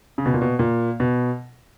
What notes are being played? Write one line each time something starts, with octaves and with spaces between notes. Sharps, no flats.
C#3
B2
A#2
B2
A#2
B2